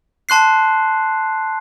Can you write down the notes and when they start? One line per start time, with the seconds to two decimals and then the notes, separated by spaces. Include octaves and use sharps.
0.29 A5 C6 F#6 C7